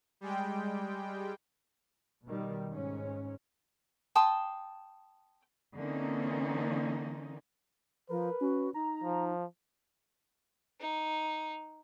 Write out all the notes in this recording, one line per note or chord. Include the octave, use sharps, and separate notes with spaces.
G3 G#3 G5
B2 D#3 G3
G#2 C#4
G5 A5 C6 D#6
D3 E3 A#3 C4 C#4 D#4
F3 A#4 B4
C#4 F#4
D#4 A#5
F3
D#4